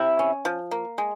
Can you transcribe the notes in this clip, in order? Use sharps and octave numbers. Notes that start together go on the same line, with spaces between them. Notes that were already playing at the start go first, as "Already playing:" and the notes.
Already playing: C3 E4
C#4
F3
A#3
G#3